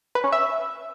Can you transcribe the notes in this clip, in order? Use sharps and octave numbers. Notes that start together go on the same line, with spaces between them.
B4
C#4
E5